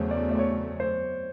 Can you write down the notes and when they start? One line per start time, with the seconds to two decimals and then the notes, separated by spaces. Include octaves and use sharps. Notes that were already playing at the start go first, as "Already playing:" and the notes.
Already playing: E2 C#3 F#3 A3 C5 C#5
0.11 D5
0.31 D5
0.39 C#5
0.80 C5